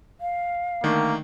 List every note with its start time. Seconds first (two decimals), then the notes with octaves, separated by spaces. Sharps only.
0.21 F5
0.84 D3 D#3 A3 A#3